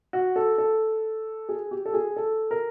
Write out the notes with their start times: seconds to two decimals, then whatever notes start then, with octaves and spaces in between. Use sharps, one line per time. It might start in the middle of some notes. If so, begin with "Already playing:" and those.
0.13 F#4
0.36 A4
0.58 A4
1.49 G#4
1.71 G4
1.86 A4
1.94 G#4
2.16 A4
2.51 A#4